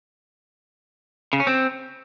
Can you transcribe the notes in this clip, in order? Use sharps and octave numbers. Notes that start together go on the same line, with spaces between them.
C#3
C#4
C4